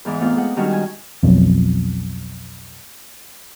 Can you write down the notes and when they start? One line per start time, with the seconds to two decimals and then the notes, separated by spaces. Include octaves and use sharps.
0.05 E2 G#2 E3 D6
0.19 A3 B3 C4 F4
0.37 G#3 F#5
0.57 D#3 G3 G#3 C#4 D4 F#4
0.73 G#5
1.23 B1 F2